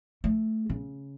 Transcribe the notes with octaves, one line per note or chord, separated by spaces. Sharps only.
A3
C#3